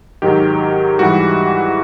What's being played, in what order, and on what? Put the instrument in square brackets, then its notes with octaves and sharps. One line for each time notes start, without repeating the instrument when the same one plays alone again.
[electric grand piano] G#2 D#3 F#3 G4
G#2 E3 G3 F#4